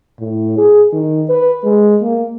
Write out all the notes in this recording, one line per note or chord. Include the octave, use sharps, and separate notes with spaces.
A2
G#4
D#3
B4
G#3
A#3